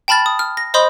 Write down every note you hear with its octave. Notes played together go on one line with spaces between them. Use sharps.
G5 A5 B5 F6 A6
D#6
F6
A#6
C5 D#5 B5 C6 D#6 G6